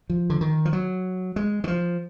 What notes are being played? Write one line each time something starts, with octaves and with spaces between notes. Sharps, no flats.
F3
D3
D#3
F3
F#3
G#3
D#3
F3